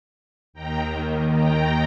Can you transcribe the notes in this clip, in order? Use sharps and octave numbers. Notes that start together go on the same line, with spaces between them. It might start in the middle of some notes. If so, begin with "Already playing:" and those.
D#2 D#3 G5 A#5
G5 A#5